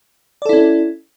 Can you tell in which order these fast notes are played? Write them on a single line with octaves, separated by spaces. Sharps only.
D5 A4 E4 C#4